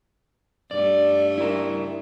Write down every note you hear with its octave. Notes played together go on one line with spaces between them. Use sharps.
G2 A3 D5
E4 A#4